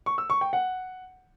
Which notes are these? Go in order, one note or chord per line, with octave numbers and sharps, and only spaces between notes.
C#6
E6
C#6
G5
F#5